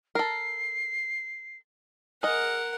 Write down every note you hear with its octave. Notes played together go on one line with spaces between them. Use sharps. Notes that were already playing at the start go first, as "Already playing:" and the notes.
A4 A#4 C7
G#4 A#4 D#5 F#5 F6